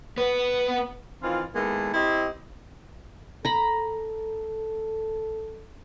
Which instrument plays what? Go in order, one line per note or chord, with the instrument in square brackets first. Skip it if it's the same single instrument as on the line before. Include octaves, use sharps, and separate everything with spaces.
[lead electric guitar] B3 B4
[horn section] D#3 E3 C4 F4
D#3 G#3 A#3 B3 E4 A4
C4 E4 G4 C5 D#5
[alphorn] A4 [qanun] A#5 B5